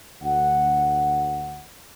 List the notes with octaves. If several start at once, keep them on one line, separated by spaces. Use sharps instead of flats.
D2 F#5